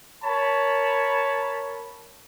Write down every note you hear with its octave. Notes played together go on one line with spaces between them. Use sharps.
A#4 C#5 A5 B5